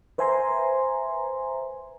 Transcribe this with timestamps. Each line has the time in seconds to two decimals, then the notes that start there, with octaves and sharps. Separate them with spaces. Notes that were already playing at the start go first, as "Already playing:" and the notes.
0.18 B4 C5 E5 G#5 A#5 C6